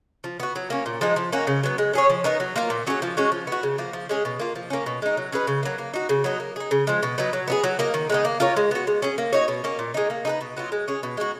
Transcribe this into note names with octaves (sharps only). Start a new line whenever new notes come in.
F3
B3 F#4
F#3
A#3 C#4
A#2
F3 G#3 D#4
F3
A#3 C#4 F#4
C#3
F#3 B3
G#3
C#4 G#4 C#5
F3
B3 D#4 A#4
F#3
A#3 F4 A#4
A#2
F#3 C#4 G#4
F3
G#3 C#4 F#4
F3
B3 F#4
C#3
F3 A#3
F3
G#3 C#4 G#4
B2
A#3 F4
F3
A#3 C#4
B2
G#3 D#4
F#3
C#4 G#4 B4
C#3
F#3 A#3
A#3
D#4 F#4
C#3
F#3 B3 D#4
A#3
D#4 G#4
C#3
F3 G#3
B2
F#3 B3 D#4
F#3
B3 D#4 G#4
F#3
A#3 D#4 A#4
D#3
G#3 B3 D#4
A#3
F4 A#4 C#5
G#3
B3 F#4
G#3
C#4 G#4
A#3
D#4 F#4 C#5
B2
A#3 C#4
A#2
G#3 D#4
A#3
D#4 G#4 B4
B2
F#3 B3 F4
G#3
C#4 G#4
B2
G#3 D#4 F#4